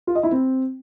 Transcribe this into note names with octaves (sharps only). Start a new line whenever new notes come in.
F4
D#5
E4
C4